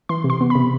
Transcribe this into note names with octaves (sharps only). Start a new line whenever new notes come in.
E3 C6
C3
C6
B3
B5
C3